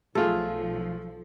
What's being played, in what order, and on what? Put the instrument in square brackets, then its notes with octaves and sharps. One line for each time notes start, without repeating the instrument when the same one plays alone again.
[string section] B1 F3 [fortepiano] A3 F4 G#4 [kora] A4